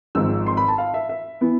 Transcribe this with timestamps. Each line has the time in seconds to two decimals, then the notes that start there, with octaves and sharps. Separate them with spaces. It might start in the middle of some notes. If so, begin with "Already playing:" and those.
0.15 G#1 G#2 F3 E6
0.46 C6
0.57 B5
0.68 A5
0.78 F5
0.94 E5
1.09 E5
1.41 E3 B3